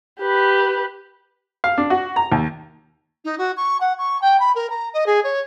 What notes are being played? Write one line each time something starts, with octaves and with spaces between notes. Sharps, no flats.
G4 B4
F5
D4
F#4
A#5
D#2
D#4
F#4
C#6
F#5
C#6
G5
B5
A#4
A#5
D#5
G#4
C#5